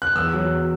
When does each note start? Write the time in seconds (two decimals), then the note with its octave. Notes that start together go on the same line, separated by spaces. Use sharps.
0.02 F#6
0.16 E2 E6
0.34 F#3